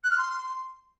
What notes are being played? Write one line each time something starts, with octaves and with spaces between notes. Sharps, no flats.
F#6
F6
C6